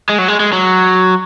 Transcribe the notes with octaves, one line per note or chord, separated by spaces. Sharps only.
G#3
F#3
G#3
G#3
F#3